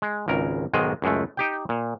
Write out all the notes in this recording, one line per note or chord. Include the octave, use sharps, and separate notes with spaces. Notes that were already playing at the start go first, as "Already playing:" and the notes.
G#3
G#1 C#2 A#4
B1 G#2 D#3 G#3 D#5
C#2 F#2 G#3 A3
D#4 G4 G5
A#2